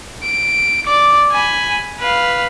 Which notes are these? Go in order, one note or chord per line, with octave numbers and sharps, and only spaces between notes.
D7
D5 D6
G#5 B5
B4 F5